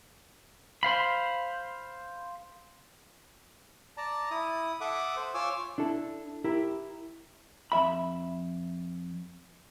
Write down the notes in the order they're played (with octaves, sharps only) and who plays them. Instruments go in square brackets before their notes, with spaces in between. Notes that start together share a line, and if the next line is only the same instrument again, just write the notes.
[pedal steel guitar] C5 F5 B5
[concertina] D5 A5 A#5
E4 D#6
A4 E5 F#5 D6 D#6
C5
F4 C#5 G#5 D6 E6
[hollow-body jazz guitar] D4 E4 A4
E4 G4 A#4
F2 E5 B5